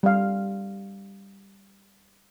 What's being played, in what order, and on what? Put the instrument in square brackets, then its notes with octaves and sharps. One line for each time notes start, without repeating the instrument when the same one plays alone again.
[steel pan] G3 F5